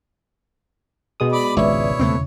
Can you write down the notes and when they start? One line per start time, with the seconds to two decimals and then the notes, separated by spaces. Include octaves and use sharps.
1.20 B2 G#3 D#6
1.32 D5 B5 D6
1.57 G#1 C#2 E4 B4 C#5 D5 E5
1.99 E2 C#3 A3 B3 C4